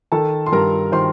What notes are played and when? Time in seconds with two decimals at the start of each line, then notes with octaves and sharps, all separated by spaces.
0.12 D#3 A4 A5
0.46 C6
0.52 G2 A#4 A#5
0.92 D#3 C5 C6